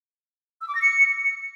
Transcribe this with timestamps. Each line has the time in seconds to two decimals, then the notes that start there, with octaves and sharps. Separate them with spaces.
0.61 E6
0.68 D6
0.75 A#6
0.82 C#7